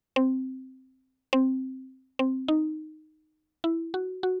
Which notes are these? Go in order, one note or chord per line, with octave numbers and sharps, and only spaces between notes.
C4
C4
C4
D#4
E4
F#4
F#4